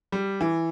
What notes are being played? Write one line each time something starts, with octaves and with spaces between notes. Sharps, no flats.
G3
E3